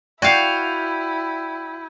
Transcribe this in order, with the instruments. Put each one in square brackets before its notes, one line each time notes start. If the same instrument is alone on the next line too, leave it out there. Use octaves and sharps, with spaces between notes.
[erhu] E4 [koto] F#4 F5 [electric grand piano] D5 G5 [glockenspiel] G6 G#6 D#7